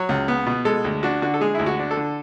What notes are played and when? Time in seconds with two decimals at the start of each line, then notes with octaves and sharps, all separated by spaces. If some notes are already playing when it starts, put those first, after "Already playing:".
Already playing: F#3 C#5
0.09 C#2
0.28 B3
0.46 B2
0.65 G#3 A4
0.84 D2
1.03 D4 F#4
1.22 D3 F#4
1.34 A4
1.41 G#3 G#4
1.55 D2 E4
1.66 F#4
1.79 D4
1.91 A4
1.97 D3